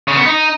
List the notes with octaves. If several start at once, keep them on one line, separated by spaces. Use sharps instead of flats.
C#3
B3
D#4